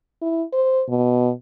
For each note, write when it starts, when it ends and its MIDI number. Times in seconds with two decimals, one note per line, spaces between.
0.22 0.44 64
0.53 0.83 72
0.88 1.31 47